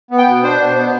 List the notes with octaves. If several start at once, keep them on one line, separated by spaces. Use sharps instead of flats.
B3
G5
B2
D4 C5
B2
B3